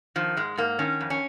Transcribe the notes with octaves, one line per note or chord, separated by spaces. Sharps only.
D#3 F3
G#2 G#3
G#2 A#3
D#3 C#4
F2
C#4